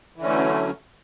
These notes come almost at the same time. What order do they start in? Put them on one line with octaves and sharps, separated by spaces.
E3 D3 C#4 A3 F#3